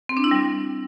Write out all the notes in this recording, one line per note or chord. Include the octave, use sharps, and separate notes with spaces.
C4
D4
E4
G3